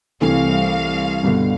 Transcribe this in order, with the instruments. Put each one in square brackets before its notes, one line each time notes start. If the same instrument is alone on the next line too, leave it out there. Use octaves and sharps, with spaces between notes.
[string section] C2 F5 [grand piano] C3 E3 A3
[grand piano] G2 B2 D3